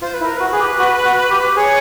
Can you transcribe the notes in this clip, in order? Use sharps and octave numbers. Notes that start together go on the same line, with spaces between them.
F4 C5
B4
E4
A#4
F#4 B4
G#4
G4
F#4
F#4
G4
G#4 C#5